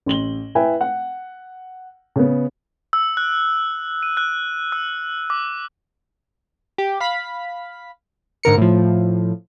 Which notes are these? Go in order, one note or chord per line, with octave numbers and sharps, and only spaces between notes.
A1 C6 F#7 G7
E4 B4 E5 G5 G#5
F#5
C#3 B3
E6
F#6
D#7
F#6
E6
D6
G4
F5 B5 B6
G#2 D3 A#4 C#7
A2 F3